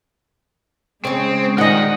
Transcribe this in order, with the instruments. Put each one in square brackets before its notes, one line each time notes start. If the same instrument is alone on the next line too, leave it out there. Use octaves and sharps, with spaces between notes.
[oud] C#3 C#4 [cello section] G#3 [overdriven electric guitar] C4
[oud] A#2 G3 G#4 [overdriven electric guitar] D#3 [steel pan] D#5 F#5